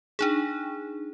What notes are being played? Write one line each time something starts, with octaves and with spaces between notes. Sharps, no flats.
D4 D#4 G#4